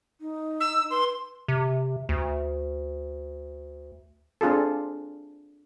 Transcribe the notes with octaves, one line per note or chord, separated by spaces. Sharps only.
D#4
E6
B4 C6
C3
D2
C4 D4 F4 G#4 A4